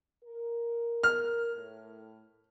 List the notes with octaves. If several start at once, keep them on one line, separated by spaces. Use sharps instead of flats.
A#4
F6
A2